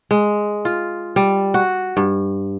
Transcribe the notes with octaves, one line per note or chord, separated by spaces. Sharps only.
G#3
F4
G3
F#4
G2